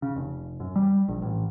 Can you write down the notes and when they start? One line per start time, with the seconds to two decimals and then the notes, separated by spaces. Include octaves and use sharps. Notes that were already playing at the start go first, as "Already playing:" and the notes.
0.02 C#3
0.16 F1
0.60 F#2
0.76 G3
1.08 A#1
1.22 A1